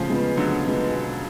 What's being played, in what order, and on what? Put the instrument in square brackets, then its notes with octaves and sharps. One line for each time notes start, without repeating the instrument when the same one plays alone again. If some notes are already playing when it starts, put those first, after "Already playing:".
Already playing: [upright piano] A2 [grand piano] C#3 F3
[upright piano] G#3 B3 F4 B4
[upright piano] A2 [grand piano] D3 F#3
[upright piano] G#3 B3 F4 B4
B2